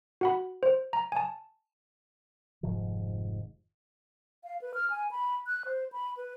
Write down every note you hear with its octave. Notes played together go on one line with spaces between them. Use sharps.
F#4 F#5 B5
C5
A#5
G#5 A5
F1 G#2 D#3 F3
F5
B4
F6
G#5
B5
F#6
C5
B5
B4